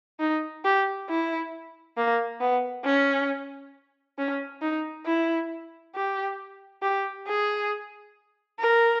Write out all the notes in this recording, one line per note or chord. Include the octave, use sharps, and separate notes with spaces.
D#4
G4
E4
A#3
B3
C#4
C#4
D#4
E4
G4
G4
G#4
A#4